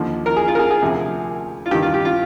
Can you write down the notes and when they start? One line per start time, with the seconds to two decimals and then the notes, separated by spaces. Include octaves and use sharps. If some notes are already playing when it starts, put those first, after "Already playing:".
Already playing: D#2 D3 F3
0.26 A#4
0.36 G#4
0.48 F4
0.55 A#4
0.59 G#4
0.70 G#4
0.82 D2 C3 F3
1.66 F4
1.71 G2 G4
1.74 D#3
1.82 F4
1.94 G4
2.05 F4